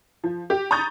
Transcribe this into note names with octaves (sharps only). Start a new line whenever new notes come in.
F3
G4
A#5 B5 C#6 D#6 G6 A6